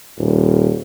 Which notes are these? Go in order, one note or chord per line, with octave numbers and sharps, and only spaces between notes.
D#1